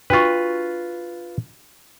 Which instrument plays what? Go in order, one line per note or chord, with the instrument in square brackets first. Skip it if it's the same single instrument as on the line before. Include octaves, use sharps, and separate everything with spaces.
[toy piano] D4 F#4 C#6 [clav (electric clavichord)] F4 B4